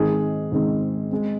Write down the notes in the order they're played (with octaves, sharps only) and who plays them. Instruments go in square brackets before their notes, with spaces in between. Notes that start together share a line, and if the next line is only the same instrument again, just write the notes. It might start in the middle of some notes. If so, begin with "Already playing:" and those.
Already playing: [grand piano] G#2 D#3 G#3 C4 G#4
G#2 D#3 G#3 C4
G#3 C4